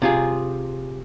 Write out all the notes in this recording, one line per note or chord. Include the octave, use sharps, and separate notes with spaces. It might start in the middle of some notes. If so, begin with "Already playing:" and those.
C3 F4 G#4